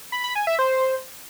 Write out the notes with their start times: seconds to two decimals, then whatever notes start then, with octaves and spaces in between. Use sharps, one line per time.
0.12 B5
0.24 B5
0.35 G#5
0.47 E5
0.59 C5